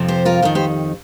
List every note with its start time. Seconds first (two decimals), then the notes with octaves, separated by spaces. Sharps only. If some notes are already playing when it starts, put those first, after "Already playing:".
Already playing: F2 C3 F3
0.08 G4 C5
0.25 F4 A#4
0.42 F2 D#3 F4 A#4
0.55 G4 C5